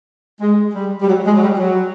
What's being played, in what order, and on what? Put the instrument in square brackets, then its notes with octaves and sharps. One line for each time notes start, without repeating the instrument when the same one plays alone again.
[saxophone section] G#3
G3
G3
F#3
G#3
F#3
G3
F#3